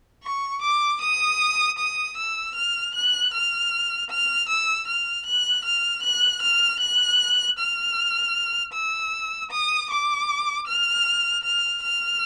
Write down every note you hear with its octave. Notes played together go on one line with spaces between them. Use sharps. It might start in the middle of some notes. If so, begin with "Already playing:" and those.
C#6
D6
D#6
D#6
E6
F6
F#6
F6
F6
E6
F6
F#6
F6
F#6
F6
F#6
F6
E6
D#6
D6
F6
F6
F6